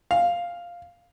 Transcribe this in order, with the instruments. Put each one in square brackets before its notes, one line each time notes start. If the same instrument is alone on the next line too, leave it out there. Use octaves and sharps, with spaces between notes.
[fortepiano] F5